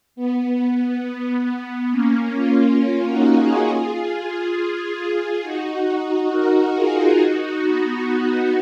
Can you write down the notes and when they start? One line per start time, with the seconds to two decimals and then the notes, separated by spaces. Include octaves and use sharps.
0.16 B3
1.91 A#3 C#4
2.35 C#4 F4
2.79 C#4 F4
3.08 D#4 F#4
3.37 F4 G#4
5.42 D#4 F#4
5.86 D#4 F#4
6.29 F#4 A#4
6.74 F4 G#4
7.18 D#4 F#4
7.61 B3 D#4
8.06 B3 D#4